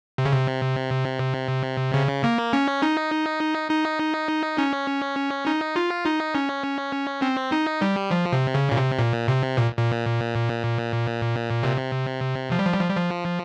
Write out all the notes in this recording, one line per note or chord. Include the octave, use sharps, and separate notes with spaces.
C3
C#3
C3
C#3
A#3
C#4
D#4
D#4
C#4
D#4
F4
D#4
C#4
C4
D#4
G3
F3
C3
C#3
A#2
C3
A#2
C3
A#2
A#2
C3
F3
G3
F3
G3
F3
G3
F3